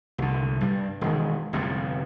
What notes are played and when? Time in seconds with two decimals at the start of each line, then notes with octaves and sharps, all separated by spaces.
0.18 C2 D3
0.61 G2 G3
1.01 E1 D#3 G#3
1.53 G1 F2 A2 C3